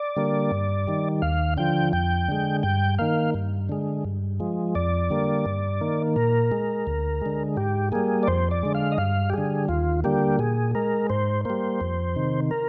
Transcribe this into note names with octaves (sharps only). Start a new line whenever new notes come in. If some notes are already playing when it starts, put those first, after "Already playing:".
Already playing: D5
D3 G3 A#3
G2
D#3 G3
D#2 F5
D3 F3 G5
F2 G5
D3 G#3
G2 G5
D#3 A#3 F5
G2
D3 G#3
G2
F3 G#3
F2 D5
D3 G3 A#3
G2
D#3 A#3
A#2 A#4
G#3
D2
D3 G#3
G#2 G4
G3 A#3 G#4
D5
F2 C5
D5
D3 G#3
F5
D#5
G2 F5
G4
D3 G3 G#4
D#2 F4
D3 G3 A#3 G4
A#2 G#4
G#3 A#4
G#2 C5
G3 A#3 C5
F2
C3 D#3
A#4